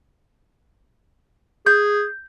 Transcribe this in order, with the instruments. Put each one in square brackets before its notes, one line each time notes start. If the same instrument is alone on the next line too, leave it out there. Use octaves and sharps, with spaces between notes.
[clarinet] G#4 [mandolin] G6